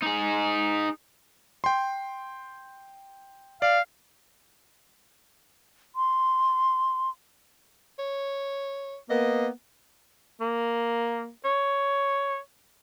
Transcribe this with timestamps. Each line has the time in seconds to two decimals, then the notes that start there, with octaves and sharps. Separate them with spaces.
0.03 D#4 G#4
1.64 G5 C6
3.62 D5 F5
5.96 C6
7.99 C#5
9.10 A#3 B3 D#5
10.41 A#3
11.44 C#5